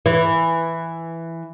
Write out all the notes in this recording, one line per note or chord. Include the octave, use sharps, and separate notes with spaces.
E3